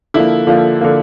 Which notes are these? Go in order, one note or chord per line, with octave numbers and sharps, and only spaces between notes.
D3 F3 A#3 E4
D3 F3 A#3 F4
D3 F3 A#3